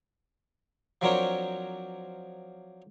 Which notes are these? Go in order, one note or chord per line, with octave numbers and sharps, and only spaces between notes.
F3 F#3 C4 D4 A#4 C#5